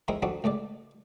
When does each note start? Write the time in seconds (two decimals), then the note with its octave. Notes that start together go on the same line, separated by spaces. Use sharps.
0.08 G#3 C4 D#4 E4 A#4
0.22 C4 D4 D#4 F#4 A4
0.44 C#2 A2 G#3 D5